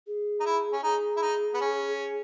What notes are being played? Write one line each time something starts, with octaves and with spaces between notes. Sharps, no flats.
G#4
D#4
E4
C#4
D#4 G#4
E4
D#4
B3
C#4